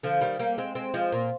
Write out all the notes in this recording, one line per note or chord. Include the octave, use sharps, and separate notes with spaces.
D3 F3
D#3 G3
G3 A#3
G#3 C4
G#3 C4
F3 G#3
A#2